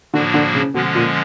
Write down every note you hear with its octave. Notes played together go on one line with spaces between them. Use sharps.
A2 D3 F3 A#3 D4 F#4
D3
C#3
B2 D3 F3 G#3 C#4
A#2